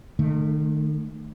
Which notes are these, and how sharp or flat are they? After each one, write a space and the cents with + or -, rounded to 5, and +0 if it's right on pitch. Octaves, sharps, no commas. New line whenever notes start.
D#3 -40 A3 -5